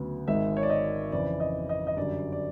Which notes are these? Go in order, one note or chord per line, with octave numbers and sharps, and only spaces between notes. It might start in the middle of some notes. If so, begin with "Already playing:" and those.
Already playing: D2 C#3 F#3 B3
G#1 G#2 D#3 G#3 E5
C#5
D5
D#5
F2 C#3 E3 D5
D#5
D#5
D#5
F#2 D3 G3 D5
D5